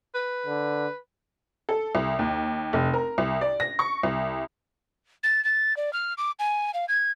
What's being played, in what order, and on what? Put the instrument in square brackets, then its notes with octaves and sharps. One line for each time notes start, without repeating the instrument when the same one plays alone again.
[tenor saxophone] B4
[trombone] D3
[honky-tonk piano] A4
C2
D#2
F1
A#4
C2
D5
A#6
C#6
C2
[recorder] A6
A6
D5
F6
D6
G#5
F5
G#6